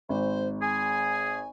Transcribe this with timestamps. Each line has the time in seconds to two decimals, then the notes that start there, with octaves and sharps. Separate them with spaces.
0.09 G#1 C5
0.62 G#4 G#5